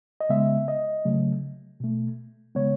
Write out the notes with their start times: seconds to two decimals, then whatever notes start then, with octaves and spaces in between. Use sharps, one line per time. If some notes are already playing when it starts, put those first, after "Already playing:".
0.21 D#5
0.29 C#3 G#3 B3 E5
0.68 D#5
1.05 C#3 F#3 A3
1.80 B2 A3
2.55 C#3 G#3 B3 C#5